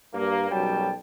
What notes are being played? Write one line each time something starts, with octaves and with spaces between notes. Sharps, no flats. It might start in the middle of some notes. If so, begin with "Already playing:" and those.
G2 A#3
B1 F#2 F#3 G3 G5 A5